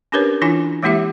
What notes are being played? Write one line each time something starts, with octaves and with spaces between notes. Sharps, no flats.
C#4 D4 G4 A#4 B4 C#5
E3 D4 E4 F4 G#5
E3 G#3 A#3 E4 G4 E5